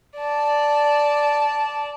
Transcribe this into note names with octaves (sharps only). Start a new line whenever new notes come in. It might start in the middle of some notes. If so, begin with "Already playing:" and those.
D5 A5